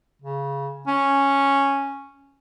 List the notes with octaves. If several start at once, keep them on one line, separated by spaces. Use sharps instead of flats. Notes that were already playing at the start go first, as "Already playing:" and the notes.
C#3
C#4